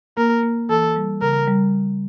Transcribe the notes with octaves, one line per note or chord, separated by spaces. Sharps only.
A#3 A#4
A#3
E3 A4
G3
C#3 A#4
G3